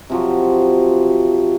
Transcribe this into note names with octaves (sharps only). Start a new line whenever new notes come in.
C3 F3 F#3